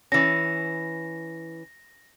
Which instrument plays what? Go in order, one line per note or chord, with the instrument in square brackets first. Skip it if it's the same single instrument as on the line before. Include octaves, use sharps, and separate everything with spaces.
[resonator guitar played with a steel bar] E3 C#4 [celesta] A#6